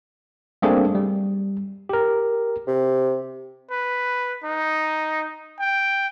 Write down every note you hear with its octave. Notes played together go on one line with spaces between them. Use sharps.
G3 A3 A#3 C4 D4 G#4
G3
G4 A#4
C3
B4
D#4
G5